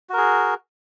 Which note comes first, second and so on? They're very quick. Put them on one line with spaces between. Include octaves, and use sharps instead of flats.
F#4 A#4 G#4